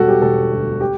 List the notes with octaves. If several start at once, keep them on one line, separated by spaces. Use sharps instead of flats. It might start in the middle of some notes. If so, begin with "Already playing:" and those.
Already playing: E1 G3 F#4 A4
G4
E1 A4
D2
G4